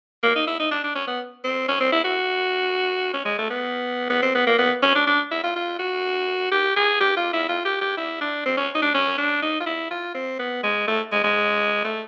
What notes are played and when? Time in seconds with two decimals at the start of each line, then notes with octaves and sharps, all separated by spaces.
0.23 A#3
0.36 D#4
0.47 E4
0.60 D#4
0.71 D4
0.84 D4
0.95 C#4
1.07 B3
1.44 C4
1.68 C#4
1.81 C4
1.92 E4
2.04 F#4
3.14 C#4
3.25 G#3
3.38 A3
3.50 B3
4.10 B3
4.22 C4
4.35 B3
4.47 A#3
4.59 B3
4.83 C#4
4.95 D4
5.07 D4
5.31 E4
5.44 F4
5.56 F4
5.79 F#4
6.52 G4
6.76 G#4
7.01 G4
7.17 F4
7.33 E4
7.49 F4
7.65 G4
7.81 G4
7.97 E4
8.21 D4
8.46 C4
8.57 C#4
8.75 D#4
8.82 D4
8.94 C#4
9.18 D4
9.42 D#4
9.61 F4
9.66 E4
9.91 F4
10.15 C4
10.39 B3
10.63 G#3
10.88 A3
11.12 G#3
11.24 G#3
11.84 A3